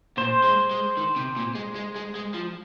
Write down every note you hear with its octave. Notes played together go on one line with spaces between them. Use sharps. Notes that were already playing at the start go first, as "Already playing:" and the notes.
A#2 C5
G#3
G#3
D#3
C3
A#2
G#3
G#3
G#3
G#3
F3